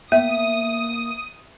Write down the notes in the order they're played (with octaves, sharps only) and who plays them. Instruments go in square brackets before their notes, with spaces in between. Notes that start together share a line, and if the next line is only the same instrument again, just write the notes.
[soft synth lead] A#3 [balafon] B3 [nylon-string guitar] E5 [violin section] D#6